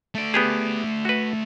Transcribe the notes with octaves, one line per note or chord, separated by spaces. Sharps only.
A3 D5
B3 G4 G#4
F#4 B4